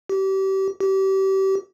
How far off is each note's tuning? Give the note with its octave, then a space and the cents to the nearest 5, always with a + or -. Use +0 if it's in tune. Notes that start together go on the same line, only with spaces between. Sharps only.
G4 -30
G4 -30